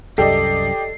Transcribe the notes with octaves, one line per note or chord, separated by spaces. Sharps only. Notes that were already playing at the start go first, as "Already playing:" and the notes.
C2 F#2 G4 A4 D5 D#5 C7